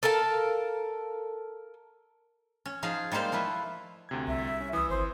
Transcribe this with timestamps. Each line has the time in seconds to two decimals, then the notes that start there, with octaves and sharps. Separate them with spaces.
0.03 A4 A#4 F5 A5
2.66 C#4
2.83 F3 D#4 G#4 F5
3.12 G3 G#3 A#3 C5 F5
3.32 F3 A3 E4 B4
4.09 D2 C3 G#6
4.27 C2 E5
4.60 C#4
4.73 E3 D#6 E6
4.89 G#1 C5